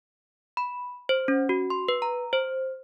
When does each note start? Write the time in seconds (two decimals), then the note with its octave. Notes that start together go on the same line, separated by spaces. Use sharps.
0.57 B5
1.09 C5
1.28 C#4
1.49 F#4
1.70 C6
1.88 B4
2.02 A#5
2.33 C5